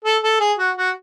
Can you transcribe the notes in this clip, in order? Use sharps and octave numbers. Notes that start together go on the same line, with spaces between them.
A4
A4
G#4
F#4
F#4